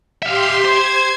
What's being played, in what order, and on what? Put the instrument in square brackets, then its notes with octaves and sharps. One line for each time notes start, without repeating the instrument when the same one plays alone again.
[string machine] G4 C6 [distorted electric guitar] E5 F5
[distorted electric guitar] C5 [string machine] G#6